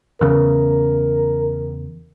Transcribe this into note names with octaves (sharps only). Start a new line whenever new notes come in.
E2 C#3 A#4